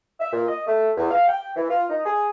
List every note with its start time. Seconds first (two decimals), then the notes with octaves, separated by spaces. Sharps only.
0.20 E5
0.33 A#2
0.48 D#5
0.66 A3
0.97 E2
1.10 F5
1.27 G5
1.55 E3
1.69 F4
1.90 D#4
2.04 G#4